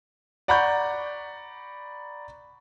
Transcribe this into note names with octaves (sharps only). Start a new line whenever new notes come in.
D5 F#5 A#5 B5 C#6 G6